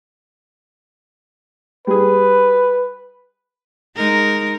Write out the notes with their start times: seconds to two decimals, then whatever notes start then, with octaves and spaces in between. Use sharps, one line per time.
1.87 G3 G#4 B4
3.96 G#3 D#4 A#4